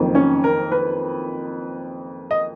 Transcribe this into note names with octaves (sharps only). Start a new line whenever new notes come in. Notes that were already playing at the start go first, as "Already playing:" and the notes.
Already playing: F#1 F2 D#3
C#4 C#5
A#4
B4
D#5